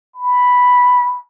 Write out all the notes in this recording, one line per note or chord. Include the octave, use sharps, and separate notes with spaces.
B5